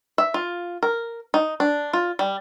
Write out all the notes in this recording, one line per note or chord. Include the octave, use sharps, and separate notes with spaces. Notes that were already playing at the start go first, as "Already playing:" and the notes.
E5
F4
A#4
D#4
D4
F4
G3